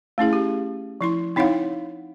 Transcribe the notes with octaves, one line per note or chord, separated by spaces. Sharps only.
A3 C#4 E4 G#4
G4
F3 E4 C6
C4 D#4 E4 C#5 F5 F#5